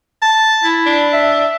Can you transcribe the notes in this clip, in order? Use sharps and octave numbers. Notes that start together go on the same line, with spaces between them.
A5
E4
D4
E5